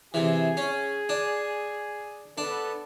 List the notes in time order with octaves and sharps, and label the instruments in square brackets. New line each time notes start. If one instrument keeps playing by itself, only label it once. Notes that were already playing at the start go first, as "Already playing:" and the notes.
[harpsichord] C3 E3 [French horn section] G#4
[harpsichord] C#4
D4
[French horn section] B3 A4 [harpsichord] D4